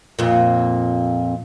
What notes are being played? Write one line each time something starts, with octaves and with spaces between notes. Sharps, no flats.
F2 A#2